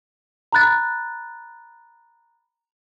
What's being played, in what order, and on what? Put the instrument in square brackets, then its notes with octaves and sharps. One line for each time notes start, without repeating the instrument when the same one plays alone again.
[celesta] A#5 B5 F#6 A6